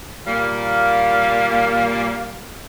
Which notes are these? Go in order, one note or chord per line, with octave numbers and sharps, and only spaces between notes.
A#2 G3 A#3 F5